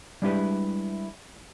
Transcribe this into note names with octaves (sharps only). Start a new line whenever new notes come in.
G3 G#3 D4 E4 G4 B4